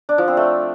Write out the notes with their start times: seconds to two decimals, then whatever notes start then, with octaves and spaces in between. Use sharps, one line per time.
0.09 D4
0.18 F3
0.28 C4
0.37 A3